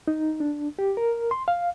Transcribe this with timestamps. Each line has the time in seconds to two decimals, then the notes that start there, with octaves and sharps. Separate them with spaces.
0.08 D#4
0.40 D4
0.79 G4
0.97 A#4
1.31 C6
1.48 F5